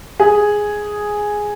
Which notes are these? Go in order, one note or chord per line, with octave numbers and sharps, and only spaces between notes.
G#4